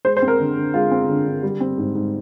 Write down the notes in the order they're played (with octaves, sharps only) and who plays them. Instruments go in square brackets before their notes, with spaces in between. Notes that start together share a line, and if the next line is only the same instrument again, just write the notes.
[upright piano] G#3 C5
C5
C4
A#4
D3
D3
G#3 F4
C4
D3
D3
G3
C4
G#2
G#2